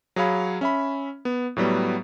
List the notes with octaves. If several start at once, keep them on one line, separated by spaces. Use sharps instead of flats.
F#3 G#4 C#5 F5 B5
C#4 E5 B5
B3
A2 F#3 G3 B3